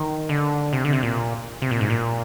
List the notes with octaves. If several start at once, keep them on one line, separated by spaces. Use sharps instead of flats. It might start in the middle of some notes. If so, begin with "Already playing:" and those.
Already playing: D#3
D3
C3
D3
C3
A#2
C3
A#2
G#2
A#2